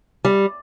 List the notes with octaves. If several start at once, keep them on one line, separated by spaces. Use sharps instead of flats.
G3